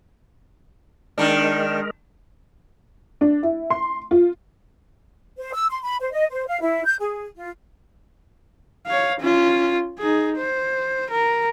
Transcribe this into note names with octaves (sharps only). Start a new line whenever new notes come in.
D#3 G#3 D4 A#4
D4
E4
C6
F4
C5
E6
C6
B5
C5
D#5
C5
F5
E4
G6
G#4
F4
C#5 F5
C#4 F4
D#4 G#4
C5
A#4